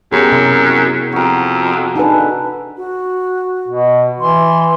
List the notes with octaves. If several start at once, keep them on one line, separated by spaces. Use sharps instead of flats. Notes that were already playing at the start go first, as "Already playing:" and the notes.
F#2 B3 G4 G#4 A#4 B4
C3 E4
F2 F#4 A#4
D3 D#4 G#4 B4 A5
F#4
B2
E3 C6